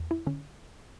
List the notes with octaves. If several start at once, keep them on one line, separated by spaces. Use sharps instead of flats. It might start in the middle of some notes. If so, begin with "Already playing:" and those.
Already playing: E2
E4
D3 C#4